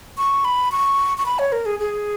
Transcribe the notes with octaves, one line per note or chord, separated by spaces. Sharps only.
C#6
B5
C#6
C#6
B5
C#5
A#4
G#4
G#4